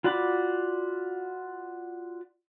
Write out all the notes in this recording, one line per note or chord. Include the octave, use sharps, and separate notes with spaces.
F4 F#4 D5 B5 D6